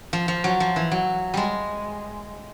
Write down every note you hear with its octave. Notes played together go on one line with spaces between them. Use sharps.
F3
F3
F#3
F3
E3
F#3
G3 G#3